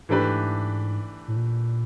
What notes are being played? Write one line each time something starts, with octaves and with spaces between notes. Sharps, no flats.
G#2 E3 A3 D4 G4 B4
A2
A#2